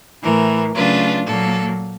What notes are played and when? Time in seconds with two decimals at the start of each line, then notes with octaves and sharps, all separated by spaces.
0.23 A2 E3 A3 A#4
0.75 C#3 F#3 A3 D4 F4 B4
1.26 A#2 F#3 A#3 A4